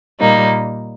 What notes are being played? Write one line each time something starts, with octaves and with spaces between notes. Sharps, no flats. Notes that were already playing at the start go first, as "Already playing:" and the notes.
A#2 G3 A#3 D#4